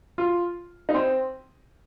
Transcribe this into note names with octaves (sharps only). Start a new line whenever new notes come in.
F4
D#4
C4